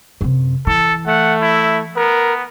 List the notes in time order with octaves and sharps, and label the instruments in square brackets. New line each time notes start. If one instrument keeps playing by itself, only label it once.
[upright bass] F#2 C3
[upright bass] E3 [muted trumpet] A4
[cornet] A3 [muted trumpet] F#5
[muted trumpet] E4
[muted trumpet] B3 [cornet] A#4